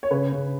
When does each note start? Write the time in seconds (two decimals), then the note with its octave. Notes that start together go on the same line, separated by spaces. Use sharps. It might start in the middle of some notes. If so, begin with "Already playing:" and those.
0.03 C#5
0.11 C#3 B4
0.32 C#3